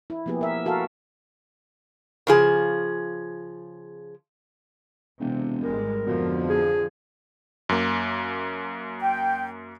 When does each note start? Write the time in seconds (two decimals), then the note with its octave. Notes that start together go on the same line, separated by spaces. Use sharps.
0.10 E4
0.26 F3 A#3 B3 G4 G#4
0.41 A#4 E5
0.66 F#4 A4 A#4 F5
2.27 C#3 F3 G#4
5.20 E1 C3
5.64 G#1 G3 G#3 A#4
6.06 F2 B2 D3 F3
6.49 G#4
7.69 F#2 A#3
9.00 G5